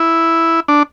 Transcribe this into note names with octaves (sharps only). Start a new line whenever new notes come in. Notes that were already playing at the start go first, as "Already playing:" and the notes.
Already playing: E4
D4